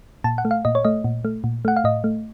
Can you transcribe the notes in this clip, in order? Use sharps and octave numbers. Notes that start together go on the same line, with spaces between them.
A#2 A5
F#5
A3
F5
A#2 D#5
C#5
A3 D#5
A#2
A3
A#2
A3 F#5
F5
A2 D#5
A3